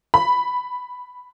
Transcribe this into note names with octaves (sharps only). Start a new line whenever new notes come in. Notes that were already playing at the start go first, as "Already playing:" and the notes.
B5